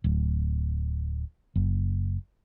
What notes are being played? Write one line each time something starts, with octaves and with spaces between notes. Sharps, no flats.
D1
F#1